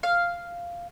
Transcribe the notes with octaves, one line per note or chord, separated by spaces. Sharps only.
F5